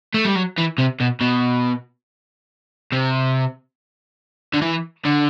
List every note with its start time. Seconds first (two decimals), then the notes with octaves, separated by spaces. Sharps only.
0.14 A3
0.25 G3
0.35 F#3
0.58 E3
0.78 C3
1.00 B2
1.21 B2
2.92 C3
4.54 D3
4.62 E3
5.05 D3